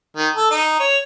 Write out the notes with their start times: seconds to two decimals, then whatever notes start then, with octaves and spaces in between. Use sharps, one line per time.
0.16 D#3
0.35 A4
0.51 D#4
0.79 C#5